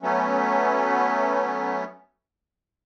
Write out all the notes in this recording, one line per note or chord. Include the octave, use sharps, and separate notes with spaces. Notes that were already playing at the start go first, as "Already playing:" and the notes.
F#3 A3 B3 C#4